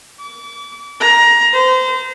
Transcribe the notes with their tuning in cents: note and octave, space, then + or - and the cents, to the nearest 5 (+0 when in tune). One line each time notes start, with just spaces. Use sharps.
D6 -35
A#5 +20
C5 -30